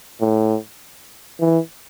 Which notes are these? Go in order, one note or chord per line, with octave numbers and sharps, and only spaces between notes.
A2
E3